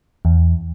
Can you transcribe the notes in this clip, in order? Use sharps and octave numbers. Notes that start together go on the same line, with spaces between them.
E2